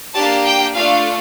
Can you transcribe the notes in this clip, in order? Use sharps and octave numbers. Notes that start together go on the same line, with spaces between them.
A#3 D4 G4 A5
G5
A3 D4 F4 F5